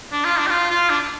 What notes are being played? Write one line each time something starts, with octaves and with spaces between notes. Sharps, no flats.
D4
F4
D4
G4
F4
F4
D4